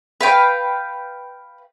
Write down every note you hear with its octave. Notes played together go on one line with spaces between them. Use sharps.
B4 F5 G5